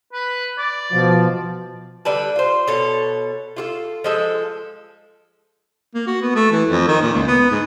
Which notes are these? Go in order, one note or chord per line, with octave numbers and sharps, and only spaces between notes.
B4
D5
B2 F3
D3 G3 B4 A5
F4 C5
B2 A4 C#5
F4 F#4 A4
F3 G#3 A4
A#3
F#4
B3
A3
E3
F2
D#3
A#2
C#2
B3
G#2